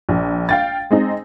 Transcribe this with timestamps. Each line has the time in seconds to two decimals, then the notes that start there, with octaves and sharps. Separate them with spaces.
0.09 A#1
0.49 F5 G5 A6
0.91 G#3 C4 D#4